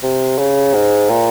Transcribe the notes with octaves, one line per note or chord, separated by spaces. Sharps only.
C3
C#3
G#2
A#2